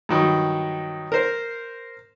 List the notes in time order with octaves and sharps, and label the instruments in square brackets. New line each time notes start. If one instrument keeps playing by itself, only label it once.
[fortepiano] G2 D#3 F#3
A#4 C5